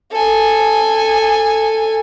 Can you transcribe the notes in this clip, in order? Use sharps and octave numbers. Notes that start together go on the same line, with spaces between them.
A4 G#5